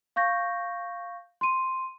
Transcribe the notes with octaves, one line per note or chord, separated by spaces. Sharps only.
F5 C#6 G6 A#6
C6 D#7